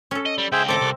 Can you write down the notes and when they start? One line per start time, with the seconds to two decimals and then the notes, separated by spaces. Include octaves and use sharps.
0.11 C#4 A4
0.26 D#5
0.38 G3
0.52 C#2 G#4 C5 E5 G5
0.68 C4 A4 E5 A#5 D6
0.82 C2